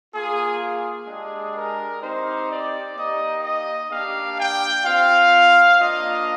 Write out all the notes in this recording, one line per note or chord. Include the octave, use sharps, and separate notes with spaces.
A#3 F4 G#4
G#4
G#3 D4 G4
A#4
C4 D#4 G4 C5
D5
A#3 D#4 G4 D#5
D#5
A#3 D4 G4 F5
G5
C4 F4 F5
A#3 D4 F4 D#5